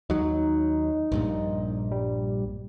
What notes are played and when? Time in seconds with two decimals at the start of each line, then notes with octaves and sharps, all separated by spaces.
0.10 D#2 F#3 D#4
1.12 A#1 G2 A#2
1.91 G3